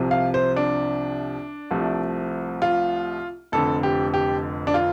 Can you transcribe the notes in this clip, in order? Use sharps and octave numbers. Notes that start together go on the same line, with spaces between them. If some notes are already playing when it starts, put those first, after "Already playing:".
Already playing: C2 C3 F3
F5
C5
D4
C2 C3 F3 A3
F4
F1 F2 D3 A4
G4
G4
D4
F4